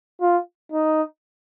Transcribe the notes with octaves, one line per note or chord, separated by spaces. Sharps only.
F4
D#4